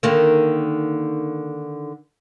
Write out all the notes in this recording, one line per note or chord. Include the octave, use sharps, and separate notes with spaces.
D3 D#3 A#3